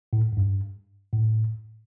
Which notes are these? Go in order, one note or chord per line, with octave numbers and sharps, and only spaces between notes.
A2
G#2
G2
A2